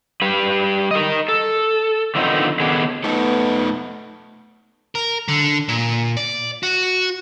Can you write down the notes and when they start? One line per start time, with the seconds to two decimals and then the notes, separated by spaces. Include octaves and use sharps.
0.22 G3 B4
0.91 A#4 D#5
1.28 A4
2.15 D3 D#3 F3 B3 C4 D#4
2.60 D#3 B3 C#4 D4 G#4 A4
3.04 A3 B3 D#4 A4
4.95 A#4
5.28 D3
5.68 A#2
6.17 D5
6.63 F#4